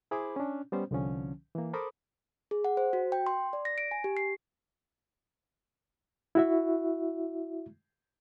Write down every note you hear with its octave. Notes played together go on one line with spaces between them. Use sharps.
E4 G#4 C5 B5 D6
C#4 D4
G3 B3 C#4 C5
C2 D3 F3 C#4
E3 A#3
A4 A#4 C5 B5 D6 D#6
G#4
F#5
C5
F#4
G5
C6
D5
A#6
D7
G#5
G4
C7
E4 F#4 E5